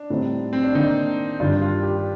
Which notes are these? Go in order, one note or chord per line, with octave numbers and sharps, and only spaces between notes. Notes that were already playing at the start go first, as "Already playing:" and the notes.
Already playing: D4
A2 G3 C4 D#4
C4
D4
D#3 A#3 D4 D#4
G2 D#3 G3 F4
F4
G4